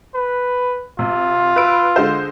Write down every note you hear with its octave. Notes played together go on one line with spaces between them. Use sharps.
B4
C3 F4
B4 E6 D7
D3 G#3 C5